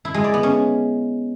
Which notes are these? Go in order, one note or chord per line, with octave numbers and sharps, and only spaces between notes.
E4
G#3
D5
B3
C#4